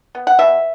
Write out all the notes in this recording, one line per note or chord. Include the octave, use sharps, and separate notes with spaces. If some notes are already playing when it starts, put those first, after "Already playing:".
B3
F#5
B2 E5